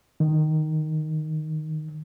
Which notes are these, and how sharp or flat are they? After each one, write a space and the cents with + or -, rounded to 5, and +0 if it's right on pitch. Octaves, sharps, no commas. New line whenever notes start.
D#3 -5